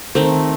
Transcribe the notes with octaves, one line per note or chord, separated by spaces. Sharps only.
D#3 A3 C4